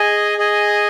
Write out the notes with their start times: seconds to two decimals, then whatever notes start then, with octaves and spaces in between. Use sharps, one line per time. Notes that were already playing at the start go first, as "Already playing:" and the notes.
Already playing: G#4 D#5 G#5
0.38 G#4 D#5 G#5